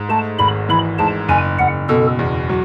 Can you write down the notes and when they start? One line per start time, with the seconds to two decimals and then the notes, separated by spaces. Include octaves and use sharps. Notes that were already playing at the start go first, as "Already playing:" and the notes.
Already playing: G#2
0.09 A3 A5
0.39 G#1 B5
0.69 E3 B5
0.98 G#2 A5
1.28 F#1 G#5
1.59 F#1 F#5
1.89 B2 A4
2.19 E2
2.49 F#3